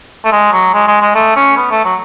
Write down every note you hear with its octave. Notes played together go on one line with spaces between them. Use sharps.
A3
G#3
F#3
G#3
G#3
G#3
A3
C#4
B3
A3
F#3